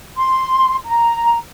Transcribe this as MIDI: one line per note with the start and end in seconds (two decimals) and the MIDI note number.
0.17 0.76 84
0.87 1.37 82